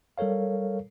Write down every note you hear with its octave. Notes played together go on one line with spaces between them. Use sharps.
G3 A4 A#4 C#5 F5